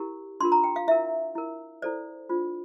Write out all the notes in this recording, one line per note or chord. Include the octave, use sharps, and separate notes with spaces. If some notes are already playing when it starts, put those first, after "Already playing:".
Already playing: E4 G4 A#4
D4 F4 A#4 C6
A#5
G5
F5
E4 A#4 E5
E4 A#4
E4 A4 C5 D5
D4 F4 C5